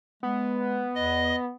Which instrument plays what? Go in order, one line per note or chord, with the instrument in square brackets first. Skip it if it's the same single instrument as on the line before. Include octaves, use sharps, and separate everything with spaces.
[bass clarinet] G#3 [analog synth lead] B3
[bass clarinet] E2 [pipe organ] D#5